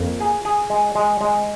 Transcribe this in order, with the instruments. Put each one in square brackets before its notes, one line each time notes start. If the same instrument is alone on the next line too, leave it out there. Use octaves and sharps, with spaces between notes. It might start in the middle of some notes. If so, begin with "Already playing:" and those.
Already playing: [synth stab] F2 [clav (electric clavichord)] A#3
[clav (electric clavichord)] G#4
G#4
G#3
G#3
G#3